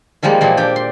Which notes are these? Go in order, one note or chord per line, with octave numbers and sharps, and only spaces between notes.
D#3 F3 G3 G#3 A#3
A#2 E3 F3
D4 G4 G5
C6